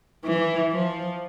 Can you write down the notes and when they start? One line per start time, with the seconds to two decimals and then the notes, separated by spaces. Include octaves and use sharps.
0.25 E3
0.72 F3